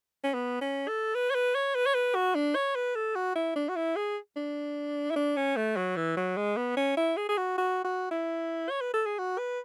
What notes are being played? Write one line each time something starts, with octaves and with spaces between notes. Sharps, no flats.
C#4
B3
C#4
A4
B4
C#5
B4
C#5
B4
C#5
B4
F#4
D4
C#5
B4
A4
F#4
E4
D4
F#4
E4
G#4
D4
E4
D4
C#4
A3
F#3
E3
F#3
G#3
B3
C#4
E4
G#4
G#4
F#4
F#4
F#4
E4
C#5
B4
A4
G#4
F#4
B4